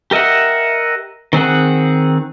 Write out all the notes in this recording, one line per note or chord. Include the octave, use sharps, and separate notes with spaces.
G4 A#4 D#5 E5 F#5
D#3 C4 G#4 F#5